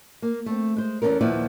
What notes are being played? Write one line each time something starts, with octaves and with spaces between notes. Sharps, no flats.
A#3
A3 C4
G#3 C5
E2 E3 A#3 C#4 A4 A#4
D#2 A#2 F3 B3 E4 D5